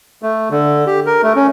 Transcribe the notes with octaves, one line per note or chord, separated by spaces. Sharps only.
A3
D3
G4
A#4
A3
C#4